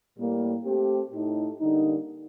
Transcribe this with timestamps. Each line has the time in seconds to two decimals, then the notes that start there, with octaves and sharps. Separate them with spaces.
0.17 A2 G3 A#3
0.64 A3 C4 G4
1.11 A2 A3 D#4
1.59 D3 G3 A#3 D#4